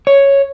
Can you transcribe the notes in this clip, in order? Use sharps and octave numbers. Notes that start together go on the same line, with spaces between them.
C#5